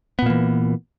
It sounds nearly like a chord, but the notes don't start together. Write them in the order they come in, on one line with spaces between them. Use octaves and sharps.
B3 A#2 A#3 E3